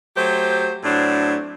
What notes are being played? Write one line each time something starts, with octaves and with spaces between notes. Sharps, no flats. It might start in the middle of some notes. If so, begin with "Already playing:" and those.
F#3 A3 G4 C5
A2 F#3 C4 D4